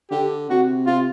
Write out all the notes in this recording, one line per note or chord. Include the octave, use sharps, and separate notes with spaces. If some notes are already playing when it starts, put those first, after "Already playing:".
D3 G4
C3 F#4
C3 F4